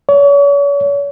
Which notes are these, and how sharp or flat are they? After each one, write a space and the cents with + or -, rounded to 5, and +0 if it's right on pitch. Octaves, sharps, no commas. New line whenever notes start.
C#5 +40